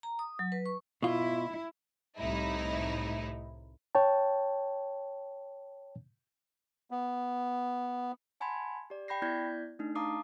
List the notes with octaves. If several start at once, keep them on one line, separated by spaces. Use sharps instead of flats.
A#5
D#6
F#3
B4
C#6
B2 E4 F4
C2 A2 D#4 E4
C#5 G5 A5
B3
F#5 G#5 A5 B5 C6 G#6
G4 D5
G5 B5 G6 A#6 C7
B3 E4 D5 G6 G#6 B6
A3 D4 D#4
F5 A5 A#5 D6 D#6 C7